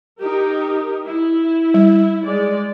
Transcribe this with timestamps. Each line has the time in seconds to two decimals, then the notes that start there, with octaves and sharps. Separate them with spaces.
0.21 D#4 G4 A#4
1.06 E4
1.74 G3
2.26 G#3 D5